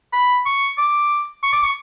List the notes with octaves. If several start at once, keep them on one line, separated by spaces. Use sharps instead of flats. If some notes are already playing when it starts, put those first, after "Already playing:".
B5
C#6
D6
C#6
D6
C#6